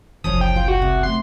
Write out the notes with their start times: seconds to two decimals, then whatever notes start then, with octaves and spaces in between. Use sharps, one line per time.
0.24 F#1 C2 F3 C#4 D#6
0.41 G5
0.56 F4
0.68 F#4
0.82 C3
1.03 A3 B3 C6